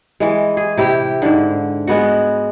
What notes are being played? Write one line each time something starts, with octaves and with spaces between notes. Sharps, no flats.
E3 G#3
G#4
C3 E4 G4 G5
G#2 D3
G#3 B3 F#4